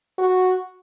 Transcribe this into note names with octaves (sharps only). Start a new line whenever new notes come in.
F#4